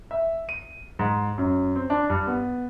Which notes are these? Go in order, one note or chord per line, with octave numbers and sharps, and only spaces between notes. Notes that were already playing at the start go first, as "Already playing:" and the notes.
E5
D#7
G#2
F#2
C4
D4
G2
B3